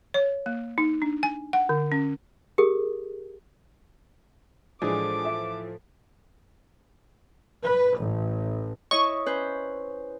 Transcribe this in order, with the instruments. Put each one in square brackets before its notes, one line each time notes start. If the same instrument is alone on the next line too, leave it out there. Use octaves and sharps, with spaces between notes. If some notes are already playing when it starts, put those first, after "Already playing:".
[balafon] C#5
A#3
D#4
D4
G#5
F#5
D3
C#4
[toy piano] G4 G#4 A#4 D#6
[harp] A2 [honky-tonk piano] E3 F3 [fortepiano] G#3 D4 G#4 [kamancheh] D6
[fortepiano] E5
[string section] B4
A1
[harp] E4 C#5 D#5 [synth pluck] C#6
[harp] C#4 B4 C5